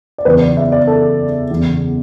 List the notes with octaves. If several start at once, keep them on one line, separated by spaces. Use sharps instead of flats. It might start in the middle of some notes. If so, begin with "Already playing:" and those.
D5
F#1 E2 E3 B4
D5
E5
D5
A4
F#1 E2 E3